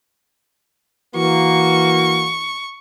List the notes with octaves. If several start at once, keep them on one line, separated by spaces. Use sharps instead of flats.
E3 A#3 F#4 C#6